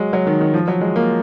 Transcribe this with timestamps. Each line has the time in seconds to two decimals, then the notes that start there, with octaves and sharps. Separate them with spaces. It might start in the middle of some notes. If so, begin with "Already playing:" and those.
Already playing: F#3 G#3
0.13 F#3
0.27 D#3
0.41 D#3
0.54 F3
0.68 F#3
0.81 G#3
0.96 A#3